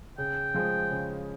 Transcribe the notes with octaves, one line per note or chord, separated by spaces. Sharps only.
C#3 G5
F3 G#3
C#3